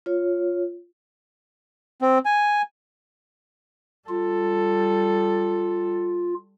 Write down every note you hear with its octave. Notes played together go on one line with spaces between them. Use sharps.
F4 C#5
C4
G#5
G3 F4 A4